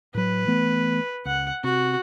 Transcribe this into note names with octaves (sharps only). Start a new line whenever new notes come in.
A2 F#3 B4
E3 A3 B3
C#2 F#5
C3 F#4